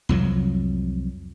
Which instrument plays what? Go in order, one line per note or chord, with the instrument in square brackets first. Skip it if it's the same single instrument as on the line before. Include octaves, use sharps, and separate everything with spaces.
[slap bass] C2 F2 F3 F#3